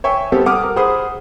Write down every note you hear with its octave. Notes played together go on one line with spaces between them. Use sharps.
C#5 E5 G5 G#5 C#6
G3 B3 C4 G4 A4
F#5 D6 D#6 F6
A#4
G#4 C5 F#5 B5 D#6